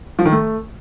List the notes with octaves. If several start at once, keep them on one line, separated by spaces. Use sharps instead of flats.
F3
D#3
A3